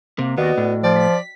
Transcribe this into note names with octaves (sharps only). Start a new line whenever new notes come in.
C3 A#3
D#2 B3 F#4 D5 D#5
A2
F3 D5 G5
B6